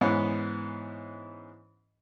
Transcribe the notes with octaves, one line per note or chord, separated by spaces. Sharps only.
G#2 E3 B3 C#4